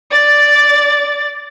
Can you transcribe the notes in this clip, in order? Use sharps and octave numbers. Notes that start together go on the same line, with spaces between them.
D5 A6